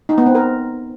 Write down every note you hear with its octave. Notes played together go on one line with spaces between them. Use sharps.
D#4
B3
C4
A#4